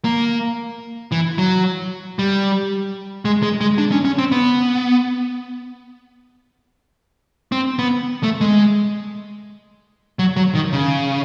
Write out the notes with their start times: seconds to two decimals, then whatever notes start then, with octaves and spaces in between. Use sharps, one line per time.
0.05 A#3
1.12 E3
1.38 F#3
2.19 G3
3.25 G#3
3.43 G#3
3.61 G#3
3.78 D4
3.92 C#4
4.05 C#4
4.18 C4
4.32 B3
7.52 C4
7.79 B3
8.23 A3
8.41 G#3
10.19 F#3
10.36 F#3
10.55 D#3
10.73 C#3